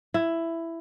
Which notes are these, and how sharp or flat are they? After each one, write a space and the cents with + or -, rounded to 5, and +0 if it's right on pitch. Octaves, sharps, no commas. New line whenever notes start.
E4 +10